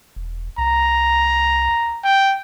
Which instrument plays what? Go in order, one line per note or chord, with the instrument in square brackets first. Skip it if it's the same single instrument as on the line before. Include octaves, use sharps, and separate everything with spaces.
[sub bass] E1
[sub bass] C2 [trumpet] A#5
[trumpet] G5